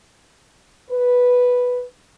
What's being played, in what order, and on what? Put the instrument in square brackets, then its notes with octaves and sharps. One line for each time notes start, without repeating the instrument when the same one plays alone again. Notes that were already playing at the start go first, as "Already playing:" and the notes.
[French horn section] B4